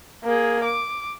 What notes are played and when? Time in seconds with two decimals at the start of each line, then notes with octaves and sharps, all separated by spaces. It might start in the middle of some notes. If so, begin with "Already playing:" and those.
0.24 A#3 G#4
0.64 D6